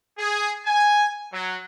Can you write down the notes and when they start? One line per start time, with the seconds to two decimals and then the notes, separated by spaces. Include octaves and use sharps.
0.18 G#4
0.65 G#5
1.33 F#3